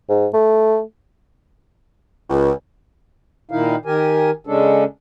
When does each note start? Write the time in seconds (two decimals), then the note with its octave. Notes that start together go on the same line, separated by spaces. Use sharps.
0.09 G#2
0.34 A3
2.30 C#2
3.51 A#2 D#3 D#4 E4 F5
3.85 D#3 G4 A#4 G#5
4.47 C#3 G#3 C#4 D4 A4